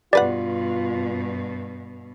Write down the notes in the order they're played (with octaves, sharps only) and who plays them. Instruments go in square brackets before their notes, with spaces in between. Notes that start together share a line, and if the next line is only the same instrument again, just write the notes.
[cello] G2 B2 [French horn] F4 [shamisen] G4 B4 F#5 [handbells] D5